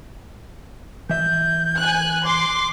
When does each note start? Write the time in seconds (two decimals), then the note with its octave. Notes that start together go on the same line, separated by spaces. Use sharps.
1.09 E3 E5 G6
1.78 G#5 F#6
2.25 C6 D6